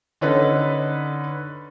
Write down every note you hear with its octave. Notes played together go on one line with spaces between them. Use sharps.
D3 C#4 D#4 A4 B4